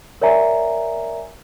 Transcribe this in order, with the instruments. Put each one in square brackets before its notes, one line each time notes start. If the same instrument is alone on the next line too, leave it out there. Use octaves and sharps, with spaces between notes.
[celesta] A#4 C#5 D5 E5 G#5 A#5